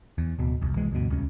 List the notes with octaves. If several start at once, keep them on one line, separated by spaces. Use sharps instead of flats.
E2
D1 B2
E1 C2
C2 E3 G#3
D2 G2 B2
D#1 C#2 C#4